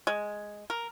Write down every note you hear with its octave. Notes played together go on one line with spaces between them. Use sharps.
G#3
A#4